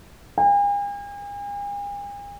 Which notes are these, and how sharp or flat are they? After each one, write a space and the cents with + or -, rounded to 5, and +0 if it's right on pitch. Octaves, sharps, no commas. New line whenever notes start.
G#5 -45